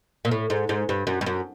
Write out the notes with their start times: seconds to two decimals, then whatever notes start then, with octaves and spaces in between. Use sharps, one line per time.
0.25 A#2
0.31 A2
0.50 G#2
0.69 G#2
0.89 G2
1.07 F#2
1.21 G2
1.26 F#2